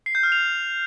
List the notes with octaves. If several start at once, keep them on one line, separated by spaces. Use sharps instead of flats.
C7
G6
F6
F7